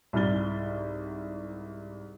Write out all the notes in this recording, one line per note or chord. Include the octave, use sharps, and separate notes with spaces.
C2 G#2 B5 F6 A6 G7